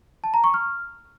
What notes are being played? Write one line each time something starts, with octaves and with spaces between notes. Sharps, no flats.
A5
A#5
C#6
F6